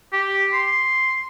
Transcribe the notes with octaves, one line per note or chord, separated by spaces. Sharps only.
G4
C6